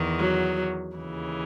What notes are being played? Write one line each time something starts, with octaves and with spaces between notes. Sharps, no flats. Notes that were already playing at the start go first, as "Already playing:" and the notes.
Already playing: E2 D#3
F#3
D#2 C#3 E3